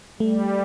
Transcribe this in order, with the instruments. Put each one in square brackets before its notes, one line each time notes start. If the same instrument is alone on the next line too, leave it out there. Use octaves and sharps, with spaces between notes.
[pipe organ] G3 [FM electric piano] A3